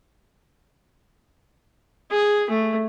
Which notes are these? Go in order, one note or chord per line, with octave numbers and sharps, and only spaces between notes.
G#4
A3